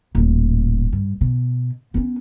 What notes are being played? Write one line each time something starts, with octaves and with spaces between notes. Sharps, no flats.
D#1 A2
G2
B2
B3 C#4